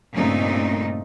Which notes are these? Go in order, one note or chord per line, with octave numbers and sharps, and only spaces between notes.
G2 A#2 C#3 A3 C4 D#4